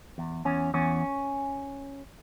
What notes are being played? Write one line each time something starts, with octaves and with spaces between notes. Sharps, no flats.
E2
E2 C#4
E2 C#4